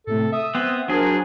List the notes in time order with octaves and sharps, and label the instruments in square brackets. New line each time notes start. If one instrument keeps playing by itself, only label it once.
[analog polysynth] A2 C3 A3 [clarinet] A4
[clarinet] E5 [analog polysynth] D#6
[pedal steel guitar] B3 C4
[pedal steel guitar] F#3 G#4 [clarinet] D4 [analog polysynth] A#4 C5